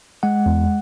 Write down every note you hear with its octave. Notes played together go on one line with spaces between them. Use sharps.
G#3 F#5
E2